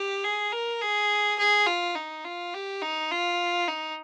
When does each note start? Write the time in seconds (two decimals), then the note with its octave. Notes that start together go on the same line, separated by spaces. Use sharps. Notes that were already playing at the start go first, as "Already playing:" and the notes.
Already playing: G4
0.24 G#4
0.52 A#4
0.82 G#4
1.39 G#4
1.67 F4
1.95 D#4
2.25 F4
2.54 G4
2.82 D#4
3.11 F4
3.68 D#4